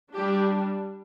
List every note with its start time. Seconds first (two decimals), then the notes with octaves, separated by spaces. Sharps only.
0.13 G3 D4 G4